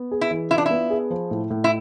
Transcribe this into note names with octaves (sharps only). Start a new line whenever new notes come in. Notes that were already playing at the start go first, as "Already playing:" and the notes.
Already playing: B3
G#4
E4
E3
E4 F4
D4
B3 E4
G#4
F3
A2
A2
E4